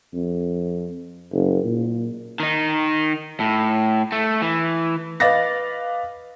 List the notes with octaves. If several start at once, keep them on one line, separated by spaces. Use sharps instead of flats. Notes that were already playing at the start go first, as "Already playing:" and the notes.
F2
F#1
A#2
D#3 D#4
A2
A3
E3
B4 D#5 F5 D6 A6 A#6